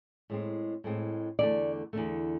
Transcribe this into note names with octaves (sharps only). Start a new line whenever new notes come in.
A2 G#3 C4
A2 G#3 C4
E2 D3 A3 D5
E2 D3 A3